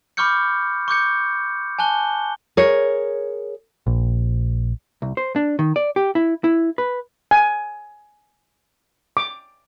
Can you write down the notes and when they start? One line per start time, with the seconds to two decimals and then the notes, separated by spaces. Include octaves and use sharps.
0.17 B5 C#6 D6 F6 G6 C#7
0.88 C#6 D6 G6 C#7
1.79 G#5 A5 F#6 G7
2.57 G#4 A#4 C#5
3.87 A#1
5.02 C2
5.17 C5
5.36 D4
5.59 D#3
5.76 D5
5.96 G4
6.15 E4
6.44 E4
6.78 B4
7.31 G#5
9.17 D6